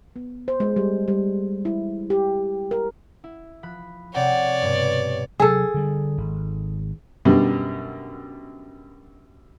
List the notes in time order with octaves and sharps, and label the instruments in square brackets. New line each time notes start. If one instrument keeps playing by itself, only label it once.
[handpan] B3
C5
G#3
G3
G3
E4
G4
A#4
[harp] E4
F3 B5 F#6
[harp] C3 F#5 G5 [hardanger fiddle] C#5 D5
[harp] G2 B2 B3
[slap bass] C3 F#3 [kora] G#4 A4
[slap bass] D3 G3
G#1
[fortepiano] F#2 B2 D3 G3